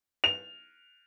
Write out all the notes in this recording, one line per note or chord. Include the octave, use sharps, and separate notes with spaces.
F7